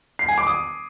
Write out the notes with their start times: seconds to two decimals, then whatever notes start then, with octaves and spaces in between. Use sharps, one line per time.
0.19 C7
0.28 G#5
0.38 D6
0.47 D#6